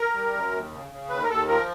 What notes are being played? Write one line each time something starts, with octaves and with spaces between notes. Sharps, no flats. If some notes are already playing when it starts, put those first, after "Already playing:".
Already playing: A#4
G3
F#2
D#2
C#3
C#3
D#2 B4
A#4
D#2 A4
F3 A#4